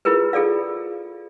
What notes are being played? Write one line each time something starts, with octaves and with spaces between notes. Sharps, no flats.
E4 F4 G#4 A#4 B4
F4 G#4 A4 D5 F5